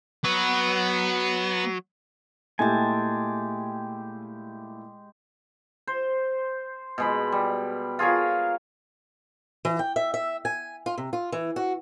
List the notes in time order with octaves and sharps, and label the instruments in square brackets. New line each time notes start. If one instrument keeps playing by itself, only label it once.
[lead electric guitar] F#3 [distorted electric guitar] B3 B4
[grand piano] A#2 A3 E4 [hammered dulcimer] G#3 G4 [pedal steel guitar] G#5 A5
[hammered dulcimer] C5
B2 G#3 B5
G3
F4 G#4 A#4 C#5
[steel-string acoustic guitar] E3
G5
E5
E5
G#5
F4
C3
F4
E3
F#4